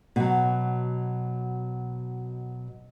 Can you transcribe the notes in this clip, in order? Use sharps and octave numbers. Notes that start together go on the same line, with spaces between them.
B2 F#3